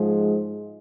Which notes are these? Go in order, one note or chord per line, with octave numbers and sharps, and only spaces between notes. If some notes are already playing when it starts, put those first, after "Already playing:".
Already playing: G#2 F3 G#3